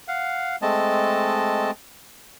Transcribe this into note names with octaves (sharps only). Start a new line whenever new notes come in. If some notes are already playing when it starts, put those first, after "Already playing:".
F5 F#5
G#3 A3 C4 D#5 A5